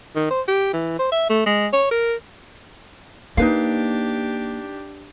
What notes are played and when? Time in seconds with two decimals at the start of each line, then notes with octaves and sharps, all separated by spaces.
0.16 D#3
0.31 C5
0.48 G4
0.73 E3
0.99 C5
1.12 E5
1.30 A3
1.46 G#3
1.73 C#5
1.91 A#4
3.37 A#3 D4 D#4 G4 B4 F5